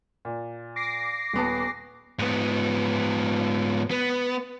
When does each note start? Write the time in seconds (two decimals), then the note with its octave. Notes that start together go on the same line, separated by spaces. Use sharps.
0.25 A#2
0.76 D6 A#6 C7
1.33 D#1 B3 A5
2.19 G#2 B3
3.91 B3